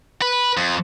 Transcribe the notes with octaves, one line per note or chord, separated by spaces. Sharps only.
B4
F2